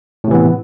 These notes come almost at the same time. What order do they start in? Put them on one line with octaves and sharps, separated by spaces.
A2 C3 E3 B3